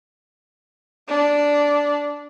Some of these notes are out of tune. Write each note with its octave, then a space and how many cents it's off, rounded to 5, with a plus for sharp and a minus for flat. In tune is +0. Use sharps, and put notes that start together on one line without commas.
D4 -10